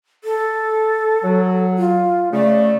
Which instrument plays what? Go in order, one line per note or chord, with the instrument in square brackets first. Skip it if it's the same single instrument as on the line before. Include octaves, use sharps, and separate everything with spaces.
[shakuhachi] A4
[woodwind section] F#3
[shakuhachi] F4
[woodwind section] C#3 A3 [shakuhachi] D5